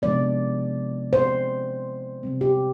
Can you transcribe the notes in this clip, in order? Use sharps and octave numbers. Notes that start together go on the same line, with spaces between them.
C3 F3 G#3 B3 D5
C5
C3 G3 C4
G4